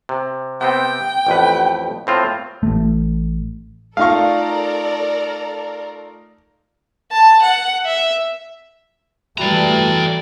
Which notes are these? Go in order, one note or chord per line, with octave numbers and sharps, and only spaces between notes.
C3
C3 B3 C4 G5
A1 F2 B4
A2 C4 F4
A1 A3
A3 D#4 F4 A4 A#4 D5 F5 C#6
A5
F#5
E5
E3 G3 A3 F#4 D5 G5 A#5 B5